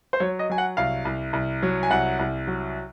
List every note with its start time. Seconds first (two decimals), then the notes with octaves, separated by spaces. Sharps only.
0.13 C5
0.20 F#3 C#5
0.39 D#5
0.50 F#3 G#5
0.58 F#5
0.77 C2 F5
1.05 C2
1.33 C2
1.63 F#3
1.83 G#5
1.90 C2 F#5
2.19 C2
2.47 F#3